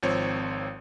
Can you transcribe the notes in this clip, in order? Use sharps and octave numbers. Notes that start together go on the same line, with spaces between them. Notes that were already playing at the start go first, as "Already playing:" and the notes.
G#1 F3 C4 C#5